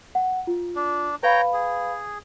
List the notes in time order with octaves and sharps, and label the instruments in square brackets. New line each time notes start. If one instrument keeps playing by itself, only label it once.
[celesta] F#5
F4
[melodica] D4
[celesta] B4 F5 B5 [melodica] C#5 G5 A#5
[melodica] G#4